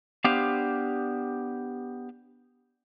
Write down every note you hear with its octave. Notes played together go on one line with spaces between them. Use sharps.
B3 D4 G4 C5 F5